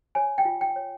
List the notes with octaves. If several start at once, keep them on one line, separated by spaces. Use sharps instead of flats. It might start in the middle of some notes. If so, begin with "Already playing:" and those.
C#5 G#5
G5
F4
G5
C#5